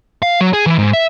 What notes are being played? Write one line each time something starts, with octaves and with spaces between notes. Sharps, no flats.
F5
F#3
G#4
E3
G#2
E5